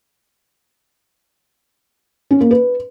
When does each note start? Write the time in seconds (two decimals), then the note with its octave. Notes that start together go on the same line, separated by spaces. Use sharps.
2.31 C#4
2.41 A#3
2.51 B4